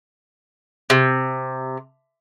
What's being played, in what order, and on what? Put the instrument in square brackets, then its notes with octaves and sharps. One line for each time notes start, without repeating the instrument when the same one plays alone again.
[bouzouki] C3